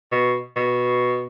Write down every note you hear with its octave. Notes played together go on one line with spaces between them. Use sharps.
B2
B2